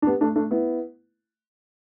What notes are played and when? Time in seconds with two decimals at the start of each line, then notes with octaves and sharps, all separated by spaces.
0.02 D4
0.07 G3 B3
0.21 A3 D4
0.36 A3 D4
0.51 B3 E4